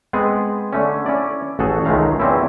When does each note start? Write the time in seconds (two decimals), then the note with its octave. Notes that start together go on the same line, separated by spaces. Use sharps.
0.13 G#3 B3 C4 G#4
0.73 D3 A3 C#4
1.06 C#4 E4 D5
1.59 A1 F#4 G#4 A4
1.85 C#2 D#3 G#3 A3 F5 A#5
2.20 E2 E3 F3 C4 C#4 E4